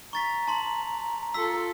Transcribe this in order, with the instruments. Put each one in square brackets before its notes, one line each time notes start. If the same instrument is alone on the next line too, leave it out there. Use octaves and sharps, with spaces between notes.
[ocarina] A#5 [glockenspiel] C#6 A6 B6
[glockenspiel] A5 C6 F#7
[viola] F4 A4 [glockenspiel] E6 B6